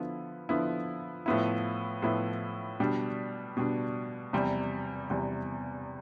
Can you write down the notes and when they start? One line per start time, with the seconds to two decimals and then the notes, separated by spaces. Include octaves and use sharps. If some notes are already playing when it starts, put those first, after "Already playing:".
Already playing: D3 F3 B3 E4
0.49 D3 F3 B3 E4
1.26 A2 F3 B3 E4
2.02 A2 F3 B3 E4
2.80 B2 G3 D4
3.57 B2 G3 D4
4.33 E2 C3 G3
5.10 E2 C3 G3